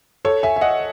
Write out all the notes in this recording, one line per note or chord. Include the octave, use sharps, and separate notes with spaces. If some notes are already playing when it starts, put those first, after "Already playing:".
A4 C#5
E5 G#5
E5
D#5 F#5